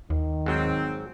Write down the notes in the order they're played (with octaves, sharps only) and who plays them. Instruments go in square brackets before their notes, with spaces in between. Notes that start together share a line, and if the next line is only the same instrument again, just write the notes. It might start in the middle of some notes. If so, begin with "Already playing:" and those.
[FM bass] D#2 [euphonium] D#3
[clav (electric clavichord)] G#2 F#3 [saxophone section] C4